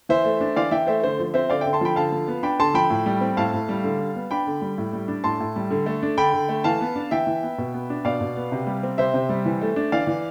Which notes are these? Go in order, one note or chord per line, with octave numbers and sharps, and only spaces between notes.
E3 C5 E5
A3
D4
E3 D5 F5
E3 E5 G5
A3 C5 E5
D3 C5
F3
C4 C5 E5
D3 D5 F5
D3 E5 G5
A5 C6
F3 G5 B5
D3 F5 A5
F3
B3
D4 G5 B5
D3 A5 C6
F3 G5 B5
A2
G3
C4
A2 F5 A5
A2
G3
D3
G3
B3
D4 G5 B5
D3
G3
A2
G3
D4
A2 A5 C6
A2
G3
D3
A3
D4
D3 G5 B5
D3
A3
E3 F5 A5
B3
D4
E3 E5 G5
E3
B3
B2
B3
D4
B2 D5 F5
B2
B3
C3
G3
C4
C3 C5 E5
C3
G3
E3
A3
D4
E3 D5 F5
E3